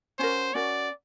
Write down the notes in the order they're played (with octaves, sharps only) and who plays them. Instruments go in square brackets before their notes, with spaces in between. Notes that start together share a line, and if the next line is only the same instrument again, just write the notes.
[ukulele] C#4 F#4 A#4 [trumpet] C5
[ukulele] C#4 F#4 A#4 [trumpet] D5